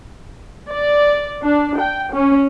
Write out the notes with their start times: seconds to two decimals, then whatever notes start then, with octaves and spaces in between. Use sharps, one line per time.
0.69 D5
1.42 D4
1.78 G5
2.12 C#4